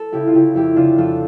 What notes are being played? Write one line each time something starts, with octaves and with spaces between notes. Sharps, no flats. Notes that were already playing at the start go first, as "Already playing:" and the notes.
Already playing: A4
C#3 E4 G4
F4
C#3 E4 G4
F2 E4 G4
C#3 D4 F4
F2 F4 A4